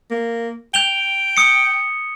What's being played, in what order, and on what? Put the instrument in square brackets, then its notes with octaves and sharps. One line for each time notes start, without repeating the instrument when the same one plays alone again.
[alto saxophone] A#3
[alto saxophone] G5 [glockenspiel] G6 F7 G7
[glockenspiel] D#6 C#7